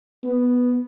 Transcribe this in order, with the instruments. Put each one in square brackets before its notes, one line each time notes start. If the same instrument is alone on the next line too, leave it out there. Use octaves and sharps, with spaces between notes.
[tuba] B3